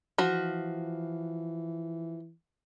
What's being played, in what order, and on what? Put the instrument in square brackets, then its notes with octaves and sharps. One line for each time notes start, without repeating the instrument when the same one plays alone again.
[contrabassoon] E3 [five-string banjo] F3 F#4